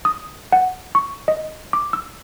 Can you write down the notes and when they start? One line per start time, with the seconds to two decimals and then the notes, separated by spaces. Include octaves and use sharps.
0.05 D#6
0.52 F#5
0.95 C#6
1.28 D#5
1.73 D6
1.93 E6